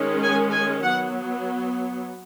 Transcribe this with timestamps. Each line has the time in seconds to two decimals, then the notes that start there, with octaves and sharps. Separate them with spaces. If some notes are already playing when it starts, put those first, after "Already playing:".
Already playing: D#3 G#3 C#4
0.22 G#5
0.52 G#5
0.83 F#3 B3 F#5